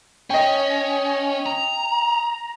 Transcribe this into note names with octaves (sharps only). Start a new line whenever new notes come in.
C#4 D#5 G5
A#5